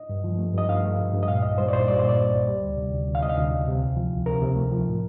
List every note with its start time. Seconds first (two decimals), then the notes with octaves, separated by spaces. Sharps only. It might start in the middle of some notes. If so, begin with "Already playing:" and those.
Already playing: D#5
0.09 G2
0.24 F3
0.38 A3
0.53 G2 D#5
0.69 G2 F5
0.83 A3
0.99 G2
1.13 G2
1.23 D#5
1.28 A#2 F5
1.43 C2 D#5
1.58 G3 C5
1.68 D5
1.73 A#2 C5
1.88 G3 D5
1.99 A#2 C5
2.09 D5
2.17 A#2
2.33 C2
2.48 G3
2.63 D2
2.77 C3
2.92 D2
3.08 D2
3.15 F5
3.22 C3 D#5
3.29 F5
3.37 D2
3.52 D2
3.68 C3
3.82 C2
3.96 F3
4.12 C2
4.26 C3 A#4
4.42 C3
4.56 A3
4.72 F3
4.87 A2